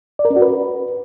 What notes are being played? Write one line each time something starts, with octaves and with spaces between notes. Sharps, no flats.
D5
A#4
C#4
F#4
B4